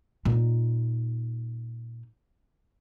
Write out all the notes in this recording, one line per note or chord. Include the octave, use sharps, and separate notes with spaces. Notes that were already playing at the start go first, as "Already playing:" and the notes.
A#2 D#4